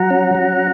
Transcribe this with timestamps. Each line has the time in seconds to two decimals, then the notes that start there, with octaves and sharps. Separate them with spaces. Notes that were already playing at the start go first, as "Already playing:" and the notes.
Already playing: F#3 F#5 A#5
0.11 C#4
0.35 F#3